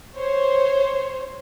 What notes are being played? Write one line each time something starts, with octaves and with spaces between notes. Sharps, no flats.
C5 C#5